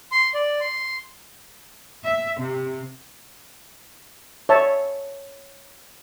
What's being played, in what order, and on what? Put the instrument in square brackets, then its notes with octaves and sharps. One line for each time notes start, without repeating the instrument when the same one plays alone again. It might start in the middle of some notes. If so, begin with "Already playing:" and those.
[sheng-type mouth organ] C6
D5
C6
[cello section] E5
C3
[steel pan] C#5 E5 A5